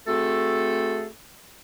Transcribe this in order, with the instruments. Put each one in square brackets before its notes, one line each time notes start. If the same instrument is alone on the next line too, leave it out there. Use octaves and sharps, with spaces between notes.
[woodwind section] A3 C4 F#4 G#4 A4